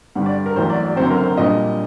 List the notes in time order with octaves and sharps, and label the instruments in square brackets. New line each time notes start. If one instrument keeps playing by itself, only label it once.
[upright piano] G2 D3 G3 F#5
D5
A#4
A1 A2 F#3 C5
D5
D5
F#1 F#2 D3 F#3 C4 C5
A#4
C5
A#1 A#2 G3 A#3 D4 D#5